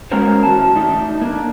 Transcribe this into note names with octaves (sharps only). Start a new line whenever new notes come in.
G#3 A#3 C#4 F#4 A#4 C5
E3 F#4 A5
A3 D4 D#4
A#3 D4